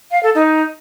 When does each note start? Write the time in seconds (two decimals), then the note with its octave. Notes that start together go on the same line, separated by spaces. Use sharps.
0.11 F5
0.23 A4
0.35 D#4